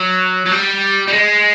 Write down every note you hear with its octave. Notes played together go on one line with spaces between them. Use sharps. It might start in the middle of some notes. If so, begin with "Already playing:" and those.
Already playing: F#3
F#3
G3
G3
G#3